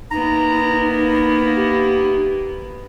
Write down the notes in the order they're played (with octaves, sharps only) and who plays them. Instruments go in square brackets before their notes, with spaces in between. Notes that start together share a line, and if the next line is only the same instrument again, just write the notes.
[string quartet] A#3 B3 E4 [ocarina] D#4 [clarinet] A#5
[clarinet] G4